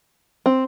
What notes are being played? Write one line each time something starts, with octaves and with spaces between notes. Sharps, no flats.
C4